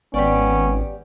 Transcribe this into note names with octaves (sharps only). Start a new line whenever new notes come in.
G#1 B3 C#4 G4 D5